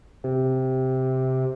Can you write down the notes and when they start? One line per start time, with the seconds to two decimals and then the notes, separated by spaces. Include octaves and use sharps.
0.24 C3